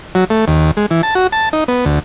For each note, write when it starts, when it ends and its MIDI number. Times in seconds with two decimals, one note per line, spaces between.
0.15 0.24 54
0.30 0.45 57
0.48 0.71 39
0.77 0.86 56
0.91 1.02 52
1.03 1.14 81
1.15 1.27 66
1.32 1.49 81
1.53 1.64 63
1.68 1.85 59
1.85 1.99 38